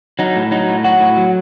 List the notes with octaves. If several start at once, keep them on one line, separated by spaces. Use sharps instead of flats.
F#3 D#4
A2
F#3 D#4
A2
F#3 F#4
A2
F#3